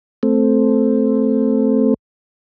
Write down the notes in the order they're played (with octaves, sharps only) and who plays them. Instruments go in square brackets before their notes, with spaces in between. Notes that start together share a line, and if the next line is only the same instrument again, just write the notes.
[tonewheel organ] A3 C4